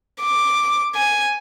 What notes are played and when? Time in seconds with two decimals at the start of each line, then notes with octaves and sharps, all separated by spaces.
0.22 D6
0.96 G#5